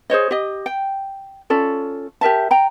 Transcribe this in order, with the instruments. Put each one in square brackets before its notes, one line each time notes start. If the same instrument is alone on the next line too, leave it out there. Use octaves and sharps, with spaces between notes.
[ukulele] G#4 C5 C#5 D#5
G4 D#5
G5
C#4 F4 A4 D5
G4 A#4 E5 A5
G5 A#5